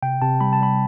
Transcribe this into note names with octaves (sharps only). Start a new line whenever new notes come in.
C3 G5
C3 A5
G3 B5
A5
G3 B5